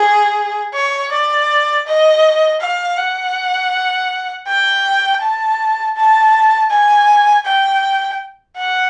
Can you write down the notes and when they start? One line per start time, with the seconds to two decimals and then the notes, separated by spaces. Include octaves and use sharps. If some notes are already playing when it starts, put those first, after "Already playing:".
Already playing: G#4
0.74 C#5
1.12 D5
1.86 D#5
2.61 F5
2.97 F#5
4.48 G5
5.22 A5
5.96 A5
6.70 G#5
7.46 G5
8.57 F#5